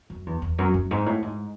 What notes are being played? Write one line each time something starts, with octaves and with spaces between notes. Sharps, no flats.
F#2
E2
E2
F#2
F#2
G#2
A2
G#2